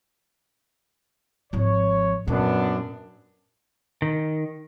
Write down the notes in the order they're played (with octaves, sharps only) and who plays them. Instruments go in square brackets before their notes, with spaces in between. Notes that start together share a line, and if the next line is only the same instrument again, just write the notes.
[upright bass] G#1 F3 [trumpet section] C#5
[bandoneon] F#2 [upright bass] A#2 [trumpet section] B3 D4
[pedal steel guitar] D#3